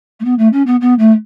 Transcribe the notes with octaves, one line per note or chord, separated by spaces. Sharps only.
A3
B3
A3
C#4
B3
B3
A3